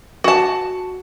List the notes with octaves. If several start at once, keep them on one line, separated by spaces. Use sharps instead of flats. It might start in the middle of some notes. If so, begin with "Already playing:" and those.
F#4 A5